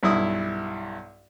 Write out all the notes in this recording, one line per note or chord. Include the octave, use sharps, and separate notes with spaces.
B1 G2 E4 D#6